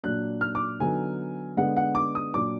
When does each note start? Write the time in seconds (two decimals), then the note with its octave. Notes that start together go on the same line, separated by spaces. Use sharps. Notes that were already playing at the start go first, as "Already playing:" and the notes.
0.03 A#2 F#3 D4 F#6
0.41 F6
0.55 D6
0.80 D3 F#3 B3 D#4 G#5
1.57 D3 G#3 B3 D4 F#5
1.76 F#5
1.95 D6
2.15 D#6
2.34 A#2 F#3 D4 D6